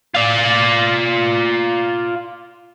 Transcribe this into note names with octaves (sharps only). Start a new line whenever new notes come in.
F4 D5